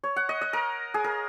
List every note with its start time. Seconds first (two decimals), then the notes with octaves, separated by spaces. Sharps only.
0.04 C#5
0.16 F#5
0.29 D#5
0.41 D#5
0.53 A#4
0.94 G#4
1.04 A#4